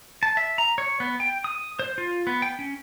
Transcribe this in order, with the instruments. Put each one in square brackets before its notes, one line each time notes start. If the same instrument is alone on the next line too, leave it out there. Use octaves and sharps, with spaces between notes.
[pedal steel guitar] A5
E5
A#5
C#5
B3
G5
D#6
C5
F4
B3
G5
C#4